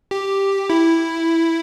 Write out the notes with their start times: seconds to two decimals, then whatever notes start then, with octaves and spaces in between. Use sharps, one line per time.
0.11 G4
0.70 E4